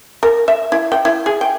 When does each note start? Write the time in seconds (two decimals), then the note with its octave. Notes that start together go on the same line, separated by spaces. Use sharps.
0.23 A#4
0.48 E5
0.72 E4
0.92 G5
1.05 E4
1.26 G#4
1.41 G5